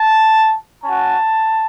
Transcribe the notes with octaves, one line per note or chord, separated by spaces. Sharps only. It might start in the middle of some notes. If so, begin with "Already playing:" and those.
Already playing: A5
C#4 F#4 A5